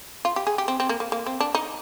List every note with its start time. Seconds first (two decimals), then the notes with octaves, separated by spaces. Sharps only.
0.25 F4
0.36 G4
0.47 G#4
0.58 G4
0.68 C4
0.80 C4
0.89 A#3
1.00 A#3
1.12 A#3
1.26 C4
1.40 D4
1.55 D#4